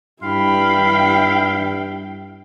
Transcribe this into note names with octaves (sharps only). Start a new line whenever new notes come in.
G2 E4 F5 G5 B5